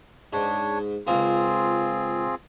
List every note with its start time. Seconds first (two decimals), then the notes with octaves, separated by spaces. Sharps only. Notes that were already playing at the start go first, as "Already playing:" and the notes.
0.33 G#2 D4 C#5
1.07 C#2 A#3 C4 F4 G#4